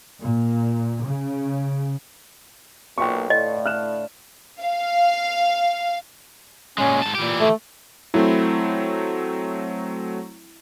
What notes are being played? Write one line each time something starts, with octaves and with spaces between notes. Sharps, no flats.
A#2
C#3
B1 A#2 F4 B4 G5 C6 C#6
A2 D3 F4 D#5 F5
D4 F6 F#6 E7
F5
A#2 G#3 C#4
G#2 A5
A#2 E3 G4
A3
F#3 A3 C4 E4